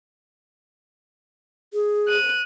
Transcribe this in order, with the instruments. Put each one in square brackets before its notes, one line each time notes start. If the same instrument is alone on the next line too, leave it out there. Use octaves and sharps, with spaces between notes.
[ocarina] G#4
[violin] F#6 D#7